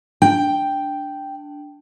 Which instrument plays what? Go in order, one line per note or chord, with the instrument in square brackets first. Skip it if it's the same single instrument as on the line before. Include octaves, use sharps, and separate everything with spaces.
[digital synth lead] D4 [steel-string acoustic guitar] G5